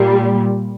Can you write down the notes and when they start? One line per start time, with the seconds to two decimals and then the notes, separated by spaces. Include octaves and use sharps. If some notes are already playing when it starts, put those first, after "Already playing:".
Already playing: A#2 G3